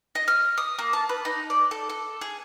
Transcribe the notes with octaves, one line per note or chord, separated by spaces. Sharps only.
D#5
F6
D#6
A#3
A5
B4
D#4
D5
A4
A4
G#4